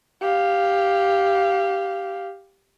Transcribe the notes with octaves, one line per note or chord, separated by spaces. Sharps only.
G4 F5